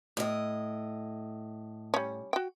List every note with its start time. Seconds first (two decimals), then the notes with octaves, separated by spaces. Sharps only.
0.17 A2 D#5
1.94 G3 C#4
2.33 F#4 G5